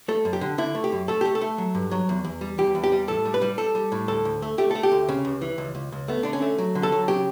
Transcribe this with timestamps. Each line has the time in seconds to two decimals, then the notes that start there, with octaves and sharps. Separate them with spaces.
0.08 A3 A4
0.25 F#2
0.33 G4
0.41 D3
0.58 D3 E4
0.75 A3
0.84 G4
0.92 F#2
1.08 A3 A4
1.21 A3 G4
1.35 A4
1.41 A3
1.58 F#3
1.75 G2
1.91 F#3
2.09 E2
2.24 E2
2.41 G3
2.58 E2 G4
2.75 E2
2.84 G4
2.92 G3
3.08 A2 A4
3.25 G3
3.34 B4
3.42 G3
3.58 G3 A4
3.75 G3
3.92 A2
4.08 D2 A4
4.25 D2
4.42 A3
4.58 A3 G4
4.71 A3 A4
4.83 G4
4.92 D2
5.09 C#3
5.25 C#2
5.41 E3
5.58 C#2
5.75 C#2
5.92 C#2
6.08 A3 B3
6.23 D3 D4
6.33 C#4
6.42 A3
6.58 F#3
6.75 D3
6.83 A4
6.92 F#3
7.08 C#3 G4